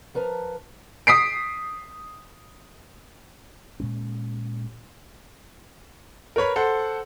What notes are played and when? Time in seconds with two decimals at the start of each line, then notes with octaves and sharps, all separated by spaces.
0.14 F3 A#4 B4 A5 A#5
1.07 D#6 B6 C7 D7
3.80 A#2 G#3 C#4
6.36 A#4 B4 C#5 B5
6.56 A4 C5 F#5